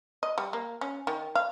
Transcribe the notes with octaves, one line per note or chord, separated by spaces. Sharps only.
D#5
G3
A#3
C#4
D#3
F5